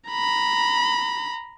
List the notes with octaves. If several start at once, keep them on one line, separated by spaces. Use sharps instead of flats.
A#5 B5